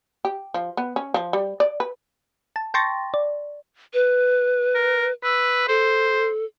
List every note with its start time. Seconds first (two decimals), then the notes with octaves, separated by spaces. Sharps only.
0.25 G4
0.54 F3
0.77 B3
0.96 C#4
1.14 F3
1.33 G3
1.60 D5
1.80 B4
2.56 A5
2.74 G5 A5 C6 C#6 A6 A#6
3.14 D5
3.94 B4
4.75 A#4
5.23 B4 E6
5.68 A4 C5